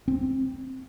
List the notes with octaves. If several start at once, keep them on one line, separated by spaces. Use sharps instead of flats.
C4